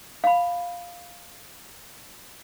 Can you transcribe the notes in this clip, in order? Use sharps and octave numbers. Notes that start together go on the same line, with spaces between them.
F5 B5